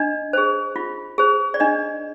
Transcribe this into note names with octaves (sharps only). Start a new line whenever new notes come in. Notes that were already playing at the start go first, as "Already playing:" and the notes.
Already playing: D4 D#5
G#4 C5
F4
G#4 C5
D5
D4 D#5